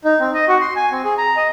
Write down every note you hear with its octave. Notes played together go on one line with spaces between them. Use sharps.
D#4
C4
D#5
F#4
C6
G#5
C4
G#4
A#5
D#5